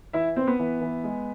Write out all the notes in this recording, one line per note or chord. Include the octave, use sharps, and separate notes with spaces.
E3 E4 E5
B3 C4 C5
B3 B4
E3
E3
G#3